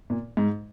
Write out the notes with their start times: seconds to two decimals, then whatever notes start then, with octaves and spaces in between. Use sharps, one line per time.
0.10 A#2
0.37 G#2